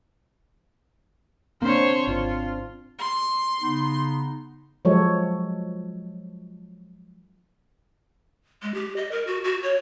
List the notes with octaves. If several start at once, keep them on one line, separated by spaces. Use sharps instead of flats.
A#3 C4 D4 C5 C#5
G#1 F4
C6
C#3 B3 D#4
F3 F#3 G#3 A4 C#5
G#3
G4
D#5
A#4
F#4
F#4
C#5